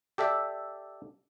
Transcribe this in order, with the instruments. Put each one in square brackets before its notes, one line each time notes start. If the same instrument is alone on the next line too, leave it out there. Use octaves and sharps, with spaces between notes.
[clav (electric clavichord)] G4 A4 D5 E5